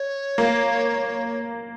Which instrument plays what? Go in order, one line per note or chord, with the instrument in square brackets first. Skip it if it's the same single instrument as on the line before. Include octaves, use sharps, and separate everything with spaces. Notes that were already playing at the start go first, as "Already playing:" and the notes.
Already playing: [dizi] C#5
[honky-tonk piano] A#3